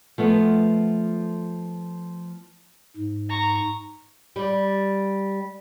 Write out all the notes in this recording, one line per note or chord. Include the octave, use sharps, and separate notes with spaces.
F3 A3 B3
G#2
A#5 C#6
G3 D5